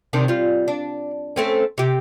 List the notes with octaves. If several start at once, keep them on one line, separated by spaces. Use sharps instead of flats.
C3 D#3 D4
G3 F4
D4
A3 C4 C#4
C3 G4